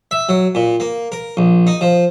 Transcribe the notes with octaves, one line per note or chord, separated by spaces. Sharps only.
E5
F#3
A#2
A#3
A#4
A#1
D#4
F3